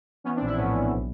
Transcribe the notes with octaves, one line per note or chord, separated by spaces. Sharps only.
E3 B3 C#4
C4 D4
A#1
D4 E4
A2 B3 C#4
A#1
B1